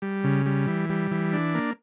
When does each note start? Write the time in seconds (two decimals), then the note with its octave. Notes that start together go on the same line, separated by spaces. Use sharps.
0.02 G3
0.24 C#3
0.46 G3
0.67 E3
0.90 G3
1.11 E3
1.33 D4
1.55 A#3